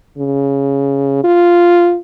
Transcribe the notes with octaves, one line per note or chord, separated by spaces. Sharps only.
C#3
F4